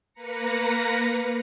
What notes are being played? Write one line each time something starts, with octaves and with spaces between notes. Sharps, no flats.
A#3 B4 A#5 A#6 C#7